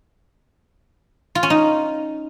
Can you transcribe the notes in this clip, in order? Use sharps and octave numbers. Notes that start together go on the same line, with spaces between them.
F4
C#4
D#4